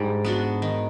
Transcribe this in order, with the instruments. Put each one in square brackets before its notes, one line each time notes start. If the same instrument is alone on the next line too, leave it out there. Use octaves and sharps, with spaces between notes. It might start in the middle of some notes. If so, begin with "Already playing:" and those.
Already playing: [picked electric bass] G#2 [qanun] G3 D4
[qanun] B3 D4 F#4
D#3